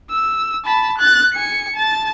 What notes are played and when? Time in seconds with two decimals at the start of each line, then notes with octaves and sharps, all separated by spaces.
0.10 E6
0.65 A5 B5
0.98 F#6 A6
1.34 G#5 C#7
1.76 A5 A6